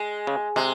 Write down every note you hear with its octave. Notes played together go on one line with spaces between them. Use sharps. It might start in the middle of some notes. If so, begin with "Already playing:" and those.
Already playing: G#3
C#3
C3 G#3